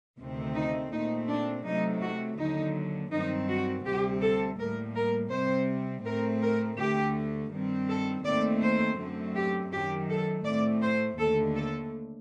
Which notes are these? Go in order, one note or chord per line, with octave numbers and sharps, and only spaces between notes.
D2 C3 D#3 A3 C4
D#4
A#2 A3 C4 D#4
D4
C3 F#3 A3 D#4
F#4
D#2 D3 F#3 D#4
G2 D#3 F#3 C4 D#4
F#4
D2 C3 G3 C4 G4
A4
A2 G3 A#3 A#4
A#4
C3 G3 C4 C5
A2 A3 C4 A#4
A#4
D2 D3 A3 G4
G2 D#3 G3 C4
A4
D#2 D#3 A3 C4 D5
C5
F#2 D3 A3 C4
G4
F#2 D#3 F#3 G4
A4
A2 A3 C4 D5
C5
D#2 D3 A3 A4
A4